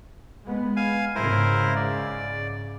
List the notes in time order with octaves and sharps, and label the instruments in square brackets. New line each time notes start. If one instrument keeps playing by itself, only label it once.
[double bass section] G#3 B3
[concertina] F5 G#5
[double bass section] G#2 C#3 [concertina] E4 A#4 C5
[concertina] D5